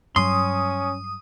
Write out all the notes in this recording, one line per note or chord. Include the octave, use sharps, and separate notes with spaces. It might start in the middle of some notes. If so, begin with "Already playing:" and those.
G2 F#3 C#4 C6 D#6